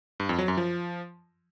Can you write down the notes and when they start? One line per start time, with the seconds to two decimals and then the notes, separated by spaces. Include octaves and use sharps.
0.20 G2
0.29 F2
0.39 F#3
0.48 F#2
0.57 F3